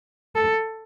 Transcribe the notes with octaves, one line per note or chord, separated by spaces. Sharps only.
A4